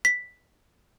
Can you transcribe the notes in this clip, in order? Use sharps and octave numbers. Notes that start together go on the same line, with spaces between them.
B6